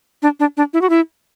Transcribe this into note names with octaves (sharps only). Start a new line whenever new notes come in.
D4
D4
D4
E4
F#4
E4